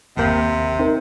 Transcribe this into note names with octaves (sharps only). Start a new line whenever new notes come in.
G1 D#2 C3 A#3 B5 G6
C4 D#4 A#4